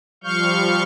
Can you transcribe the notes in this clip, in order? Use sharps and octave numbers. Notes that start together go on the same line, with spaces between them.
F3 G3 F5 C#6 F6 G6